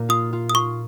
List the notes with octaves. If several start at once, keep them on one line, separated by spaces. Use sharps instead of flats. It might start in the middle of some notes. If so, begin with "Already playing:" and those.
Already playing: A#2 A#3
F4 D#6
F4
D#6
F4 C#6